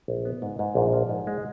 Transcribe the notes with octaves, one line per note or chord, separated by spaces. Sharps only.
A#1
B3
G#2
G#2
A#1
F3
G#2
G#3